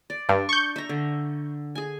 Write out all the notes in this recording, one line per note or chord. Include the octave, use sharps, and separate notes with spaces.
D5
G2 D4
C#6 G6
E5 A#5
D3
G#4 G#5